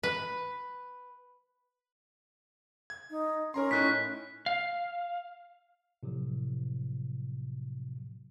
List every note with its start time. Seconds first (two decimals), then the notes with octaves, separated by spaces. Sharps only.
0.03 B4
2.90 G#6
3.10 D#4
3.54 C#4 A#4 A#5 C6
3.71 A2 D#4 E4 F#6 B6
4.46 F5
6.03 A2 C3 F3 F#3